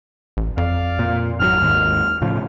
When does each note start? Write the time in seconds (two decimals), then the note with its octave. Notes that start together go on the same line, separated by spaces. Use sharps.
0.37 A1
0.57 F2 D5 F5
0.99 A#2
1.40 G#1 D#3 F#3 F6
1.61 G#1 D#2 G#2
2.22 A2 C#3 F3